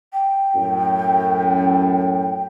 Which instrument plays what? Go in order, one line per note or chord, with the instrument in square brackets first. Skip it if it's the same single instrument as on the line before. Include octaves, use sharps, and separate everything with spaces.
[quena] G5
[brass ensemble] F#2 A2